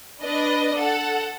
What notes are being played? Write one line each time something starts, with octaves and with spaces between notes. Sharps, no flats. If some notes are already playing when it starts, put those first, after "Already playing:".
D4 B4 D5 D#5
A4 F#5